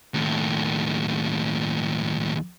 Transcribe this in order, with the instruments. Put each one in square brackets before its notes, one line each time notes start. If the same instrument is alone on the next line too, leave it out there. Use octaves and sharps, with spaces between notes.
[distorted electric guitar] D#2 A2